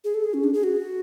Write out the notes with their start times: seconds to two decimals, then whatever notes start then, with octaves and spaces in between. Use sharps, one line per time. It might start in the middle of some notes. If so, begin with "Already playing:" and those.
0.04 G#4
0.14 A4
0.24 G#4
0.34 C#4
0.44 D4
0.54 G#4
0.64 F#4